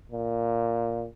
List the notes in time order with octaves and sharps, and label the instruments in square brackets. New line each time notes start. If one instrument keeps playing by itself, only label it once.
[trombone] A#2